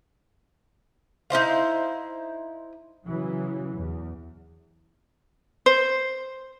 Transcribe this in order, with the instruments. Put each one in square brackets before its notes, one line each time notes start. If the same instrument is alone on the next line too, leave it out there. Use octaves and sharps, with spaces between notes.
[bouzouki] D#4 E4 C5 F5
[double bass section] C#3 E3 F#3
E2
[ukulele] C5